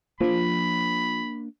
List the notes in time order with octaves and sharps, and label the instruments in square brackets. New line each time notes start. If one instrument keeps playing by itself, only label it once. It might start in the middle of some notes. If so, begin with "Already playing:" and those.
[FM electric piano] F3 [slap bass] A#3 D4 [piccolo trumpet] B5